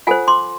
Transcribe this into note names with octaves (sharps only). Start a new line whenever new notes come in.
F4 A4 C5 F#5 G#5
C6 D6